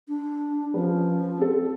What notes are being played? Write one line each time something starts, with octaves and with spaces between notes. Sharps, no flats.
D4
F3 C#4 B4
C4 A4